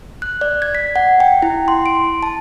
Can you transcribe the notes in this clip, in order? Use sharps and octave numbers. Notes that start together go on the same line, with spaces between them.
F#6
D5
G#6
B6
F#5
G5
E4
C6
D7
A5